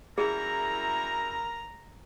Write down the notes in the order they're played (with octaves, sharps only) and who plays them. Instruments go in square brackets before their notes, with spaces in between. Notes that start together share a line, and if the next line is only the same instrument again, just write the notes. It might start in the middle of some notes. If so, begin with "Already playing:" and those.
[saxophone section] F#2 G3 E4 [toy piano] G#4 [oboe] A#4 [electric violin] A#5